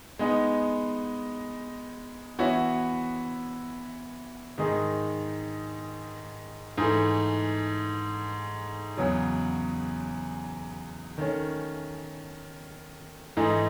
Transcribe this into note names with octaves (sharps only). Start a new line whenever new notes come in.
G#3 B3 D#4
E3 B3 F#4 C#5 E5
G#2 D#3 G#3 D#4 G#4
G#2 E3 A3
E2 C#3 F#3
D#3 A3 C#4
G#2 E3 A3 D#4